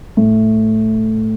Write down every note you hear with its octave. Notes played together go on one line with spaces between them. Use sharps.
A2